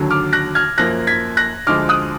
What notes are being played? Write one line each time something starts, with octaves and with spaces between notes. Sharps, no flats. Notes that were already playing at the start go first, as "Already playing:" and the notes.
Already playing: D#2 D3 F#3
D6 F6
F#6 A#6
F6 G#6
F#2 F3 A#3 F#6 A#6
G#6 B6
F#6 A#6
D2 D3 F3 G#3 D6 F6
D#6 F#6